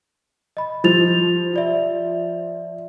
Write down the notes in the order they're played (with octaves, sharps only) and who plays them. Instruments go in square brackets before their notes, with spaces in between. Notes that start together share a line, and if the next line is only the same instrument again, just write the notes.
[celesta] D#5 B5
[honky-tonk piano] F3 [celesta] G4 A6 F7
[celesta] F4 D5 E5